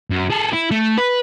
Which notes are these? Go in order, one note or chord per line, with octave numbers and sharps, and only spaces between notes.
F#2
G#4 A4
E4
A3
B4